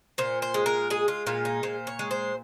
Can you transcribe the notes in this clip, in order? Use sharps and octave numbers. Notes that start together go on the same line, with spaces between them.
A#2 C5
C5
G#3
A#4
G#3 G#4
F4
A#2 F4
D#4
A#2 C5
C#5
G#3
C5